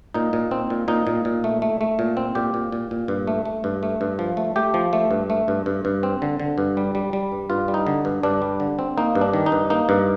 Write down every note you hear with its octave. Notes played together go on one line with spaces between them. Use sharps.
A#2 D#4
A#2
C4
A#2
A#2 D#4
A#2
A#2
A3
A3
A3
A#2
C4
A#2 G4
A#2
A#2
A#2
G2
A3
A3
G2
A3
G2
F3
A3
A3 G4
F3
A3
G2
A3
G2
G2
G2
C4
D3
D3
G2
G3
G3
G3
G2
G2 F4
G3
D#4
D3
G2
G2 D4
G3
D3
C4
A#3 D#4
G2
D4
D#3
D#4
G2
A#3 D#4
G2